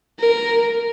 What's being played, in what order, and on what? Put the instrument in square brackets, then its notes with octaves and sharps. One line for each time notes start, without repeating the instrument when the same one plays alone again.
[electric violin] A#4